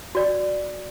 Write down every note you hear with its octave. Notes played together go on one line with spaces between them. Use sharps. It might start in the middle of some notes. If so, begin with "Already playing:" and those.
F#4 D5